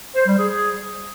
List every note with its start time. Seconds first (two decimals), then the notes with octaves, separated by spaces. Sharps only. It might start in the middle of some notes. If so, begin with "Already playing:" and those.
0.15 C5
0.26 G3
0.37 G#4
0.49 G#4